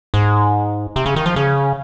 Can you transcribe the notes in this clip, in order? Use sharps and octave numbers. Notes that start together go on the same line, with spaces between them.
G#2
C3
C#3
D#3
F3
C#3